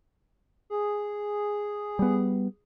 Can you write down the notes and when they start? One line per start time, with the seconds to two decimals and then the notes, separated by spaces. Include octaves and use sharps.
0.70 G#4
1.99 G3 B3